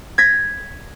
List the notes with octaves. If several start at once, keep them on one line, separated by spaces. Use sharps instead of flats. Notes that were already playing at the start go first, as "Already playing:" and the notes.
G#6 A#6 B6